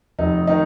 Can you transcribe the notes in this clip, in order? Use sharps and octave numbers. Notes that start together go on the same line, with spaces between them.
F1 D#4
D#3 D#4